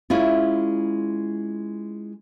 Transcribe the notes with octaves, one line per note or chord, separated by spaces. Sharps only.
G#3 C#4 E4 F4